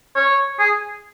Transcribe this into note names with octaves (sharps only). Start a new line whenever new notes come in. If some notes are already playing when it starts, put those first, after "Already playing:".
C#5
G#4